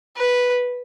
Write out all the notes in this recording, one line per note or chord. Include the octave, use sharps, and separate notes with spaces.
B4